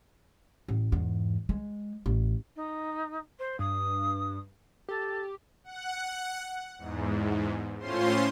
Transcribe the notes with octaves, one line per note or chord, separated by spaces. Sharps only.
A1
E2 G#2
G#3
A1
D#4
C5
G2 D#6
G4 A4
F#5
E2 G#2
A2 C#4 F4 C5 C6